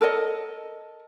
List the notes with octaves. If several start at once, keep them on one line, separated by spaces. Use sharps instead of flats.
A4 A#4 C#5 D#5